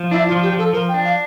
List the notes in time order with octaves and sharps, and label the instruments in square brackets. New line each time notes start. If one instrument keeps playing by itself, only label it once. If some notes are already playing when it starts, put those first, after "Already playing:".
Already playing: [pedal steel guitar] F3
[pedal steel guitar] D4 [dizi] E4
[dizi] F4
[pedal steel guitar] F3
[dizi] G4
[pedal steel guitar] F3
[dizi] A4
[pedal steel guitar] F3 [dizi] A#4
[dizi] G5
[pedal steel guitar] D4
[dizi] F5